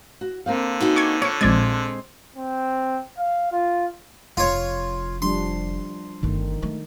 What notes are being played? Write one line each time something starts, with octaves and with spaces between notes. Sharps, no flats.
F#4
D3 A#3 C4 F5
D#4 F#4 G#4
C#6 D6 G#6
F4 C#5 C#6
A#1 G#3 C4 D5 G#6
C4
F5
F4
F1 F4 C#5
F3 G3 D4 C6
G1 D#3 A3
G#3 A3